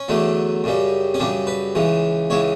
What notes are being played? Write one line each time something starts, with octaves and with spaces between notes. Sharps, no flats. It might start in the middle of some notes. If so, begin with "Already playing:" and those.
Already playing: C#4
E2 D3 F#3 A3
F#2 C#3 G3
C#4
F#2 C#3 G3 D4
B4
C#2 C#3 E3
C#2 C#3 E3 C#5